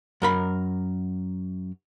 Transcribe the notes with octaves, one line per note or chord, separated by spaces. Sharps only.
F#2 A#4 B5